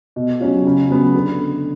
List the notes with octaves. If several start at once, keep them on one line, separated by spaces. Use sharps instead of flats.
B2
F#3 C#4 F4
C#3
F#3 B3
D3